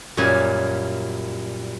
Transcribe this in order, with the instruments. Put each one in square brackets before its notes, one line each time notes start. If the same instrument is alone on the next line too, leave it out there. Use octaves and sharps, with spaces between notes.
[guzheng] F#2 A#2 G3 G#5